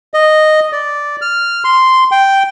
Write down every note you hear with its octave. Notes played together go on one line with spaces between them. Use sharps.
D#5
D5
F6
C6
G5